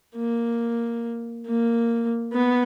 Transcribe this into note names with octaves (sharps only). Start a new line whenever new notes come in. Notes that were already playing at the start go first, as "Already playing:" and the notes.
A#3
A#3
B3